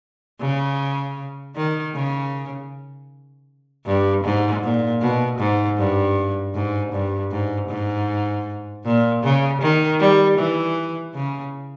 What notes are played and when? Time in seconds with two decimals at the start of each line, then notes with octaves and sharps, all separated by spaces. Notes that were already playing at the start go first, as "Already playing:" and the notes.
0.40 C#3
1.56 D#3
1.95 C#3
3.86 G2
4.24 G#2
4.63 A#2
5.01 B2
5.39 G#2
5.78 G2
6.55 G#2
6.93 G2
7.31 G#2
7.69 G#2
8.85 A#2
9.23 C#3
9.61 D#3
10.00 G3
10.38 E3
11.15 C#3